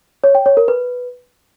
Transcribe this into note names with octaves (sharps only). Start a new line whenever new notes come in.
C#5
G5
C#5
A#4
B4